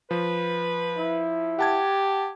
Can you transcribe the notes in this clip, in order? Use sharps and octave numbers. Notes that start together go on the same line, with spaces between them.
F3 B4
E4
G4 F#5 A5 G#6